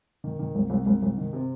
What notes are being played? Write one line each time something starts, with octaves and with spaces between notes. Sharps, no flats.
D#3
D#3
C2
C2
C2
C2
D#3
C3